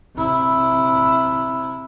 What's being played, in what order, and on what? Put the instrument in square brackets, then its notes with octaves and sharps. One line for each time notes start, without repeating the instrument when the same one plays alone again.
[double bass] C3 E4